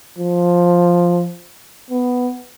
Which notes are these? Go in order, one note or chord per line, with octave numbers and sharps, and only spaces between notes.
F3
B3